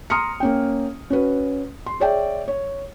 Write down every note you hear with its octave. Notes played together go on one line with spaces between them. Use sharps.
A#5 C6 D#6 F6 C#7
A#3 C#4 G5
C#4 F#4 B4
C6
G#4 C#5 D5 E5 G5
C#5